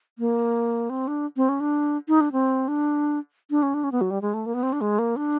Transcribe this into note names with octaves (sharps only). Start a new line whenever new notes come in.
A#3
C4
D4
C4
C#4
D4
D#4
D4
C4
D4
D4
C#4
D4
C#4
B3
F#3
G3
G#3
A3
A#3
B3
C4
D4
G#3
A#3
D4